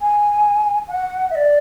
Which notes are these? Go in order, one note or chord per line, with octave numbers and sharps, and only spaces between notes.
G#5
F#5
E5
D5